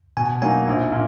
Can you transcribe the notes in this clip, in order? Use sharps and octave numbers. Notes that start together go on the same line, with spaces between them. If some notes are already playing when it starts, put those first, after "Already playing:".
B2 G#5
F#3 A#3 D#4 G#5
A#1
A#2